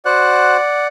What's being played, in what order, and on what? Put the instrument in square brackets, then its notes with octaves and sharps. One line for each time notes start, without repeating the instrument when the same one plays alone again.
[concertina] F#4 C5 F#6 [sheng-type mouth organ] D5 F#5